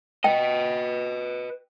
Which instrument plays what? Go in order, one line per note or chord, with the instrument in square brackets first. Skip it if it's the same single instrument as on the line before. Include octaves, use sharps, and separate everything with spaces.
[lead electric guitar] B4 D#5 [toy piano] G5